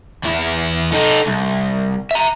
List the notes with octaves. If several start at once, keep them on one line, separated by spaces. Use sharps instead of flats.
E2 E4
D#4 A4
C2
E5 A#5